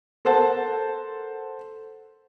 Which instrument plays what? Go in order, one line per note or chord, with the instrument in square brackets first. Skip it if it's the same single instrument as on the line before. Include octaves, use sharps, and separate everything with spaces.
[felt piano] A4 A#4 C5 F#5 A5